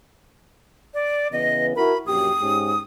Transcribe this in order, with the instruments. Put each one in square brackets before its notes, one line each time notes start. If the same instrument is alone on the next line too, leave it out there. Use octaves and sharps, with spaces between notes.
[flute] D5
[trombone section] C#3 E3 B3 [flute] D#5
[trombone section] E4 F#4 A#4 [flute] B5
[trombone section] A#1 F#2 G4 [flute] D#6
[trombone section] G#2 C#4 G4